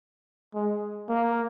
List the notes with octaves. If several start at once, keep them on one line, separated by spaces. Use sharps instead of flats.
G#3
A#3